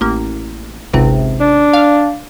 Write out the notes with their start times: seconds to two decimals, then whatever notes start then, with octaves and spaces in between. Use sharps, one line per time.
0.01 A1 A#3
0.93 G#1 C#2 C3
1.40 D4
1.73 F5